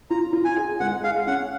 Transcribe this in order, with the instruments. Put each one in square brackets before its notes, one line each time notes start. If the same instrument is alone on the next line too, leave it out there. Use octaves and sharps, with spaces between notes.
[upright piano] F4 [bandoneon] A#5
[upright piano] F4
[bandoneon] G#5
[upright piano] G#4
[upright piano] G#3 [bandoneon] F#5
[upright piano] G#4 [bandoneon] F5
[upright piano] C#4 [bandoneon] F#5